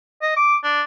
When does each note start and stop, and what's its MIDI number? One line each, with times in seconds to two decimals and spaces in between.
0.22 0.34 75
0.37 0.56 86
0.64 0.82 62